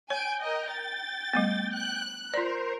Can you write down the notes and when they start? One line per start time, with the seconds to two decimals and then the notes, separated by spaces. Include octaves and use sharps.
0.10 C#5 G5 G#5 D7
0.42 A#4 D#5
0.72 A6
1.33 G3 A3 B3
1.75 F#6
2.34 F4 A#4 C5 D5